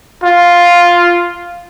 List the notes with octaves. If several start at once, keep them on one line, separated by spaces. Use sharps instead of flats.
F4